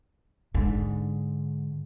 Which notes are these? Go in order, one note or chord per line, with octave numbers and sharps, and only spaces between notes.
G#2 D3